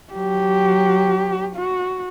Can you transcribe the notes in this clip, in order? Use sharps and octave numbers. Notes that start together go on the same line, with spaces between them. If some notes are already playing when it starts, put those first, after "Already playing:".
F#3 G4
F#4